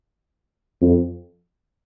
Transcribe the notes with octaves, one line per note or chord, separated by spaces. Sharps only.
F2